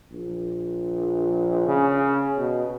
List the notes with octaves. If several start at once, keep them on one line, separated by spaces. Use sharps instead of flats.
A#1
C#3
B2